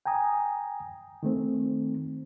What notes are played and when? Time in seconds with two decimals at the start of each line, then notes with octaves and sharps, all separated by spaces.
0.06 G5 G#5 A#5 D#6
1.23 D#3 A3 C4